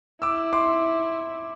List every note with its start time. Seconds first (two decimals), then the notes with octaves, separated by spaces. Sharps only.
0.22 E4 D6 E6
0.53 C6 D6